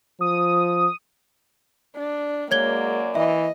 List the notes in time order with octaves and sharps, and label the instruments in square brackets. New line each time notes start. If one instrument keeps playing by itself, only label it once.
[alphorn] F3 [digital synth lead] D#6
[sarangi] D4
[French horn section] F#2 F#3 D5 [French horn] G#3 [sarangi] A#3 [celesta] C#5 G#6 G7
[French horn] E3 [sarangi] D#5 [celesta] E5